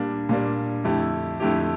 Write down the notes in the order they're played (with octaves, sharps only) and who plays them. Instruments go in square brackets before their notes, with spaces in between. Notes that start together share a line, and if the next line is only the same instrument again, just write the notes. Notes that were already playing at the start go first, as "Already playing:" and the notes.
Already playing: [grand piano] A#2 G3 A#3 D4
A#2 G3 A#3 D4
F2 D3 A3 E4 G4
F2 D3 A3 E4 G4